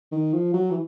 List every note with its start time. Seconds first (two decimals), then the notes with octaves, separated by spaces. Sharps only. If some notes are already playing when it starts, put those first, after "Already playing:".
0.12 D#3
0.33 F3
0.54 F#3
0.71 E3